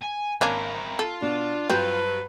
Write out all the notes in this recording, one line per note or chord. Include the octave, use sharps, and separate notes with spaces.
G#5
G#1 A#3 C#4 D4 E4 A#4
F4 A4
B2 D4
G2 F#3 C4 B4